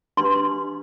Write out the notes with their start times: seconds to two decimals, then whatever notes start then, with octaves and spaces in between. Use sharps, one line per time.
0.17 D4 G4 B4 C6